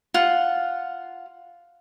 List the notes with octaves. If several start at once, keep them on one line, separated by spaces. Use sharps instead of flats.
F4 F#5